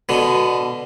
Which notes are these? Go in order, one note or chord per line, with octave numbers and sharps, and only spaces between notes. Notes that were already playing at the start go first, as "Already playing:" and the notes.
B2 D3